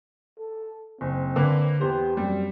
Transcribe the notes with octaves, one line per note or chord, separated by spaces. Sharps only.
A4
F#1 C4
D3 A#3 B4
E2 B3 G4 C5
F#2 G3 C4